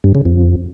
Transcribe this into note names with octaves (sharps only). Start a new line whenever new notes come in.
G2
C#3
F2